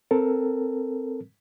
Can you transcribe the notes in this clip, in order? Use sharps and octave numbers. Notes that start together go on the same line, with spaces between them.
C4 A4 A#4